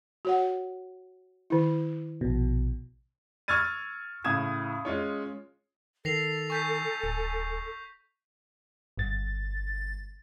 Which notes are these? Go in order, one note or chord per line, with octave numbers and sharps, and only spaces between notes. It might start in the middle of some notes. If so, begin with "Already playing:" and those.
F#4 C#5 F#5
D#3 E4
A#1 B2
C#6 E6 F6 G#6 A6 D#7
A2 C#3 F5 D#6 G#6 E7
G#3 C#4 F4 C#5
D#3 A4 A#6 C7 F7
G#5 C#6 G6 B6
D1
G1 G2 A6